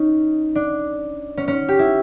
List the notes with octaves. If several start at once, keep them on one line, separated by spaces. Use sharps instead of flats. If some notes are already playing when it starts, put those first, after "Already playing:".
Already playing: C#4 D#4
D4
C#4
C#4
G4
E4